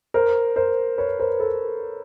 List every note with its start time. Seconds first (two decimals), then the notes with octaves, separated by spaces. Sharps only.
0.14 A#4 C5
0.56 A#4 C5
0.98 B4 C#5
1.19 A#4 C5
1.40 A4 B4